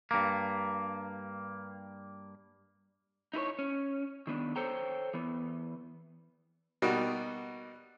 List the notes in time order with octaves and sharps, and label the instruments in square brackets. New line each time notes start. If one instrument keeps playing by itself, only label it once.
[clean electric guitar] G2 A#3
[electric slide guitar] D#4 E4 B4 C#5
C#4
D#3 B3 D4
A4 C5 C#5 G5 A#5
E3 B3
[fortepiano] B2 G3 A#3 D#4 F#4